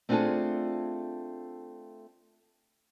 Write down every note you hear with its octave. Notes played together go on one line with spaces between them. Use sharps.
A3 C4 D4 F4 G#4 A4